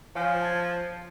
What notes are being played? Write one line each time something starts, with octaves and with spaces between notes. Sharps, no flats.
F3 C#5 F5 G#5
A5 G#6